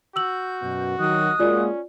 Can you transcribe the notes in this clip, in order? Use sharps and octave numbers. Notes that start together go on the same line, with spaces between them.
F#4 E6 G6 F#7
F#2 B2
D#3 F#3 D#5 D#6 F#6
G#3 A#3 C#4 F4 F#4 D5